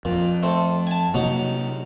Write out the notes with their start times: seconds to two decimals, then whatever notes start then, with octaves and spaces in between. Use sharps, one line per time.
0.05 F2 A#2
0.43 A3 C4
0.87 G#5 A5
1.14 C3 F#3 A#3 D#4